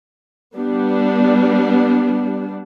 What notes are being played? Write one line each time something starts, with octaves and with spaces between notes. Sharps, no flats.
G3 B3 D4